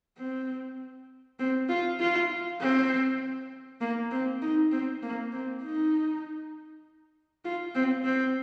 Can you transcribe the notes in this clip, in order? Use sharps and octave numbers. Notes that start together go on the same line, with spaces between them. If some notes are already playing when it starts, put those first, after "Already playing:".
C4
C4
F4
F4
C4
A#3
C4
D#4
C4
A#3
C4
D#4
F4
C4
C4